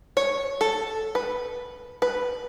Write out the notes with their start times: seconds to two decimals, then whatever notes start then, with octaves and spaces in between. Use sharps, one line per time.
0.17 C#5
0.61 A4
1.15 B4
2.02 B4